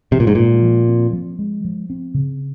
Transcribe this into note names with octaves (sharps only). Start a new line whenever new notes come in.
C3 F3
A#2
G#2
A#2 G#3
F3
C4
F3
G#3
F3
C4
C#3